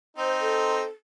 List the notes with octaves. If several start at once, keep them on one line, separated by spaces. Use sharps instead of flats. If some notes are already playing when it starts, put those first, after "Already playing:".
C4 D#4 C5
A4